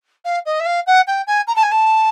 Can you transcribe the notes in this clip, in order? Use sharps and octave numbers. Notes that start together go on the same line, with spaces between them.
F5
D#5
E5
F5
F#5
G5
G#5
A#5
A5
G#5
A5